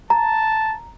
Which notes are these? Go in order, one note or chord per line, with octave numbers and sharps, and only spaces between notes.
A5 A#5